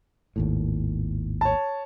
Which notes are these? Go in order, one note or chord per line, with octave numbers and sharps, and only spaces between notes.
G#1 D#2 A2
C#5 A5